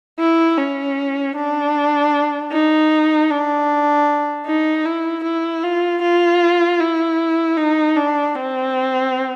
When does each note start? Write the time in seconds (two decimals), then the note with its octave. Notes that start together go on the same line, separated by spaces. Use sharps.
0.19 E4
0.57 C#4
1.35 D4
2.52 D#4
3.30 D4
4.46 D#4
4.85 E4
5.24 E4
5.63 F4
6.02 F4
6.80 E4
7.57 D#4
7.96 D4
8.35 C4